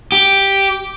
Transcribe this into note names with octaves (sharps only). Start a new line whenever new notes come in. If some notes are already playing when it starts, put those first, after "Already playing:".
G4